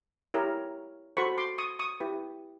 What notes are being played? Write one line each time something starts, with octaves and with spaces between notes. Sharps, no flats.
E4 G4 A#4 C#5
F#4 A4 C5 B5 C#6
C6 D6
C#6 D#6
C#6 D#6
E4 G4 B4